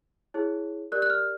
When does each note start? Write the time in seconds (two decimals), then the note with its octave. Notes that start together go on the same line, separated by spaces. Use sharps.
0.34 E4 G#4 C#5
0.92 G4 A#4 D5 F#6
1.02 F#6
1.10 F6